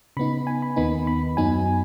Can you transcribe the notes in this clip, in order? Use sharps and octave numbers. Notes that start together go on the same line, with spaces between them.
C#3 B3 D#4 B5
G#5
B5
D#2 D#3 B3 D#4 B5
B5
F#2 F#3 B3 D#4 G#5